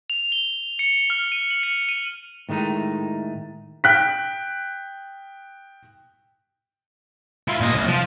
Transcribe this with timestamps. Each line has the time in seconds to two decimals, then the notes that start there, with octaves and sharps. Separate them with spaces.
0.10 F7
0.32 G7
0.79 C#7
1.10 F6
1.32 D#7
1.51 F#7
1.63 C#7
1.89 D#7
2.49 A2 D#3 G#3 A3 D#4
3.84 G5 F#6 B6
7.48 E4 F4
7.61 A#2 D#5
7.73 C2
7.87 F3